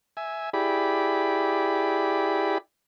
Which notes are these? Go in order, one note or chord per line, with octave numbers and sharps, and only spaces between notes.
E5 G#5
E4 G4 G#4 D5 B5